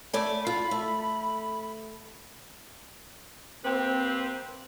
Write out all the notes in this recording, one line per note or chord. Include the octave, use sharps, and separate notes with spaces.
A3 D5 G#5 B5
F4
A3
A#3 C4 G4 B4